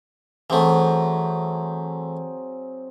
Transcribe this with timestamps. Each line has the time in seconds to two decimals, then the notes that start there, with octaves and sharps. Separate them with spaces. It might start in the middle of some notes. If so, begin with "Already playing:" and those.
0.50 E3 F#3 A3 C4 G#4